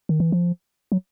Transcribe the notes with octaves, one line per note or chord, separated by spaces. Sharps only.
D#3
E3
F3
F#3